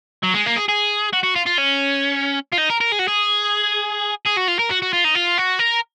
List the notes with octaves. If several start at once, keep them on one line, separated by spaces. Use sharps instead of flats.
F#3
G#3
A#3
G#4
G#4
F#4
F#4
F4
F4
C#4
F4
D#4
A#4
A#4
G#4
F#4
G#4
G#4
F#4
F4
A#4
F#4
F#4
F4
D#4
F4
F#4
A#4